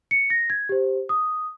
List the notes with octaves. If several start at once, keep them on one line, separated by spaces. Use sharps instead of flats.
C#7
A#6
G#6
G4 C5
D#6